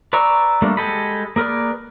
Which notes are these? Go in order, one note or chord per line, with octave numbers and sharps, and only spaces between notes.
B4 D5 A#5 C#6 E6
G3 A3 A#3 D4
G#3 G4 A4 D#5 B5
A#3 G#4 A#4 B4 D5